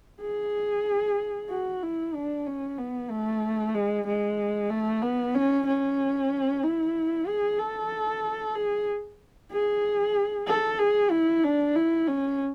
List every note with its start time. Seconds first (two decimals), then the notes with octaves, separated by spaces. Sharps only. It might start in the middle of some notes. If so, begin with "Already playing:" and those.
0.22 G#4
1.50 F#4
1.83 E4
2.14 D4
2.46 C#4
2.78 B3
3.10 A3
3.75 G#3
4.07 G#3
4.70 A3
5.02 B3
5.35 C#4
5.67 C#4
6.63 E4
7.27 G#4
7.59 A4
8.55 G#4
9.52 G#4
10.48 A4
10.79 G#4
11.11 E4
11.44 D4
11.76 E4
12.08 C#4